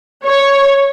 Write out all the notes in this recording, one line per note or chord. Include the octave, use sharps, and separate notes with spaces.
C#5